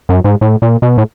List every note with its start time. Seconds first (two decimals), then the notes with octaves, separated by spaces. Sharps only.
0.09 F#2
0.24 G#2
0.41 A2
0.62 A#2
0.82 B2
0.98 A2